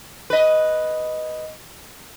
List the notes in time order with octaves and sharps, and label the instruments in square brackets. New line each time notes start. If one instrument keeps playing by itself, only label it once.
[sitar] B4 D#5